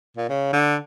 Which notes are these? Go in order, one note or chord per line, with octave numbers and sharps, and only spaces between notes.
A#2
C#3
D3